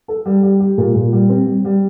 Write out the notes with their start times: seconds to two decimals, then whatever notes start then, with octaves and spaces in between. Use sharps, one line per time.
0.08 A4
0.26 G3
0.43 G3
0.60 G4
0.78 A#2
0.95 A#2
1.13 G3
1.29 C4
1.47 G3
1.65 G3